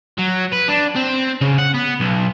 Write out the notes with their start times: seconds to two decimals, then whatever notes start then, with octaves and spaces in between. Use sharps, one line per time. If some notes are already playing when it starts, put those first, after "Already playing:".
0.19 F#3
0.53 B4
0.69 D4
0.96 C4
1.41 C#3
1.58 F#5
1.74 B3
2.00 B1